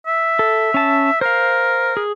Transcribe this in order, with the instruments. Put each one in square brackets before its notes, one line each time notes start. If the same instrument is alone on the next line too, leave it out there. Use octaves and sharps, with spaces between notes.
[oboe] E5
[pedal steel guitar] A4
C#4 A5
[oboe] A#4 [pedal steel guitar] C5 F5
[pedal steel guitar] G#4